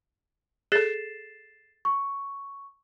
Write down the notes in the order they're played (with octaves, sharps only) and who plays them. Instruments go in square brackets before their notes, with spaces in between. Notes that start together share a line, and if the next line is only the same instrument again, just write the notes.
[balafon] G#4 A4 [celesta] A6 C7 E7
[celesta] C#6